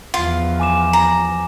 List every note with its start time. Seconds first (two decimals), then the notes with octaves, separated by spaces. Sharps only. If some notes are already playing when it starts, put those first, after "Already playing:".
0.14 E2 F3 F4
0.60 G#5 D6 E7
0.93 A#5